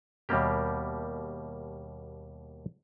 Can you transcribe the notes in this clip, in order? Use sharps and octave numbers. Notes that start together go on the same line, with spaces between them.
D#2 B2 G3 A#3 G4